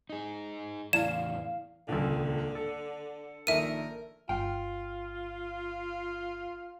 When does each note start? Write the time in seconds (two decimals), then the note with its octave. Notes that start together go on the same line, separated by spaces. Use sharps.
0.09 D#4 G#4
0.93 E2 A2 E4 D5 F5 E7
1.88 D#1 C#2 D3
2.55 A4
3.47 A#1 D#3 A4 A#4 E5 D#7
4.29 G1 F4 G5